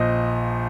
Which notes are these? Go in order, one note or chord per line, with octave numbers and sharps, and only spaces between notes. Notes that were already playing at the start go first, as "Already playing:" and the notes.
Already playing: A#1 F3 D#5